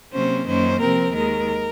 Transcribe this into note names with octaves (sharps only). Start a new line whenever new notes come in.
C3 F#3 A#3 C#4 C5
F#2 D#3 A#3 C#4 C5
C3 F3 C4 A#4
D#2 D#3 G#3 A#4